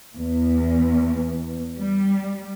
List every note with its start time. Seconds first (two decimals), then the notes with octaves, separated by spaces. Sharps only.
0.18 E2
1.79 G3